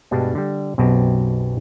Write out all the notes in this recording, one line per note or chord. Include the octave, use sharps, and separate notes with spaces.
G2 B2 G3 G#3 D4
D3 G3
B1 F#2 B2 C4 G4